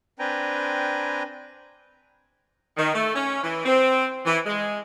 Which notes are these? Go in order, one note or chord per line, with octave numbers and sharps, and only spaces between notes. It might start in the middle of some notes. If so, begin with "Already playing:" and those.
C4 D4 B4 G5 G#5 A#5
D#3
A3
C#4
E3
C4
E3
G#3